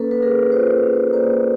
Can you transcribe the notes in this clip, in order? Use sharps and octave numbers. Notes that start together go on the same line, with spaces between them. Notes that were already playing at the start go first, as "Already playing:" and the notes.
Already playing: A#3 C#4 A4 B4
B4
A#3 G#4 A#4
F4 A#4 C5
C#4
A#3 C5 D5